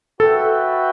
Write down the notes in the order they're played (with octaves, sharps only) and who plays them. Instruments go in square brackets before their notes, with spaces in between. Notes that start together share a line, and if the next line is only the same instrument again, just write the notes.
[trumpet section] F#4 B4 E5 G5 [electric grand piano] A4